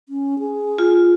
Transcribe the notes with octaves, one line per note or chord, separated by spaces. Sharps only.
C#4
G#4
F4